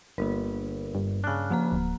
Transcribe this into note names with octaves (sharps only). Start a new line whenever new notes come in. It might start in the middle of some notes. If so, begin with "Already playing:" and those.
G1 A#3 A#4
G2
C#3 D4 F6 F#6
F3 A#3 A#5
D1